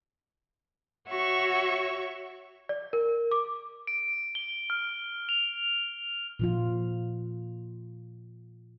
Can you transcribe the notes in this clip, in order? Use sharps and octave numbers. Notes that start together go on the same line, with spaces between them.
F#4 C#5 E5 C#6
D5
A#4
D6
D7
G7
F6
F7
A#2 F3 F4